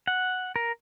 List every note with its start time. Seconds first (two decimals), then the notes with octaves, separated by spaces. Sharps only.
0.07 F#5
0.56 A#4